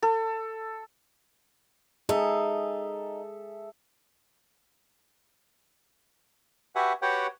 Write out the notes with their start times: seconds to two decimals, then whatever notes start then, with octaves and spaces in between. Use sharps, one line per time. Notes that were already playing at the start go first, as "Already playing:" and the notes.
0.02 A4
2.09 D#4 G#4 A4 E5
6.75 F#4 G4 B4 E5 F#5 G#5
7.02 F#4 G4 B4 C#5 F#5 G5